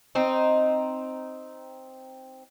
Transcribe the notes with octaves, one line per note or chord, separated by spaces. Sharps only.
C4 D#4